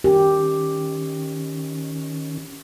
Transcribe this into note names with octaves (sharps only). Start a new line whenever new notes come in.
D#3 C#4 G4